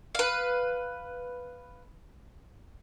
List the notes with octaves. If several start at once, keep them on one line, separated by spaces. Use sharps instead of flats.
B4 F5